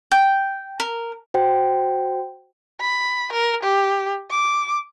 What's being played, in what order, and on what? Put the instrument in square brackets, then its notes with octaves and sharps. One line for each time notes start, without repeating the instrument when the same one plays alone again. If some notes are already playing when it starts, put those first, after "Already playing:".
[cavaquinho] G5
A#4
[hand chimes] F#4 C5 G5
[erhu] B5
A#4
G4
D6